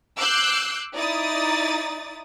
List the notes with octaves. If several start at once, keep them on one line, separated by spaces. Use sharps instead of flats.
D6 E6 F#6 G6 C7
D#4 E4 D5 D#6 A6